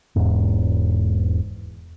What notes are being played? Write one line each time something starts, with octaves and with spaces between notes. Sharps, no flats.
E1 E2 G#2